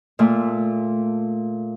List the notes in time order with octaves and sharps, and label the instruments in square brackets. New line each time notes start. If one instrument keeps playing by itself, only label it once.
[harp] A#2 A3